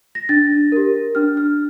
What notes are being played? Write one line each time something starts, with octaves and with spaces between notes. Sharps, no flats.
A#6
D4 A6
G4 A#4
D4 F6
F6